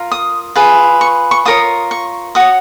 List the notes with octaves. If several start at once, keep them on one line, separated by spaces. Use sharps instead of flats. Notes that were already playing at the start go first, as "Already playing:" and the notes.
Already playing: F4 A#4
D#6
F4 G#4 B4
C#6
C#6
F4 A#4 C#5 D#6
C#6
F#4 C#5 D#6